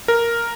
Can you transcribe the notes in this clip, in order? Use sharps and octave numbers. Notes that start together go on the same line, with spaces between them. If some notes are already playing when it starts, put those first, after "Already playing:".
A#4